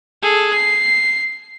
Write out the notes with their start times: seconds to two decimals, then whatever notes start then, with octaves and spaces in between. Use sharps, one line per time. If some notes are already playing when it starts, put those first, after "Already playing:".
0.22 G#4 A4
0.54 C7